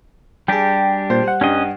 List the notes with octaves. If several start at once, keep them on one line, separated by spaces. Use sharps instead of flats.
G3 D4 G4 G#4 G5
A#2 C5
G3 F#5
G2 C#4 D#5